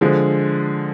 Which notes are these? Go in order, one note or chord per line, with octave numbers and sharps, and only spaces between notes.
D3 F3 G#3